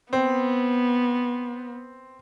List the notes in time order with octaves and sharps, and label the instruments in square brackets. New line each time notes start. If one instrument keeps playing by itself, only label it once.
[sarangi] B3 [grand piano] C4